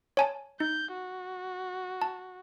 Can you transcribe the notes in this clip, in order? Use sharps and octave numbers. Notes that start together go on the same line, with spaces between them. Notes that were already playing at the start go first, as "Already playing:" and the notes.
C#5 G#5 A5
D#4 G6
F#4
A5